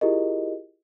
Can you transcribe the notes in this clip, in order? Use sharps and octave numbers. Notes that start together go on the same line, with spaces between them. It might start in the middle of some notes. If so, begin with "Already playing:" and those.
E4 F4 G4 G#4 A#4 D#5